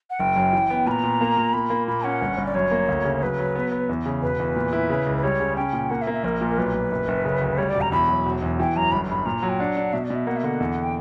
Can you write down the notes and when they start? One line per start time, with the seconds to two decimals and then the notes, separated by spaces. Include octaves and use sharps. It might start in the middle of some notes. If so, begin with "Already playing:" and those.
0.10 F#5
0.19 F#1 G5
0.36 F#2
0.53 E3
0.70 B3
0.86 A#2 B5
0.91 A#5
1.03 A#2
1.21 A#3
1.37 A#2
1.53 A#3 B5
1.70 A#3
1.88 A#2 B5
2.04 C#4 F#5
2.21 G1
2.38 G1
2.46 D5
2.54 F#2 C#5
2.71 A#3
2.88 D2
3.04 C#3
3.22 F#3 B4
3.39 F#3
3.55 B3
3.72 B3
3.89 E2
4.06 C#3
4.22 E1 B4
4.39 E2
4.56 A#2
4.73 E4
4.89 C#3
5.07 C#2
5.17 B4
5.23 G3 C#5
5.40 C#3
5.56 C#4 G5
5.73 A#2
5.90 A#3 F#5
6.02 E5
6.07 A#3
6.13 E5
6.24 A#1 A#4
6.41 A#2
6.50 A#4
6.58 B1 B4
6.75 A#2
6.91 F#1
7.08 F#1
7.25 C#3
7.41 D2
7.58 G3 C#5
7.69 D5
7.75 E1
7.81 A#5
7.92 E2 B5
8.09 F#3
8.26 E1
8.42 E2
8.60 E3 G5
8.76 F#2 A#5
8.92 G1 B5
9.09 G2 B5
9.26 A#2 A#5
9.43 F#3
9.49 G5
9.59 D4 F#5
9.77 D4
9.93 B2 E5
10.04 D5
10.10 B2 E5
10.27 A#3 F#5
10.36 E5
10.44 D3 F#5
10.60 E2
10.83 G5